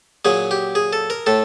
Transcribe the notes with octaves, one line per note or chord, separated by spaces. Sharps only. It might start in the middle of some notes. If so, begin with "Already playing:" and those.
A#2 F#3 G#4
G4
G#4
A4
A#4
A2 A4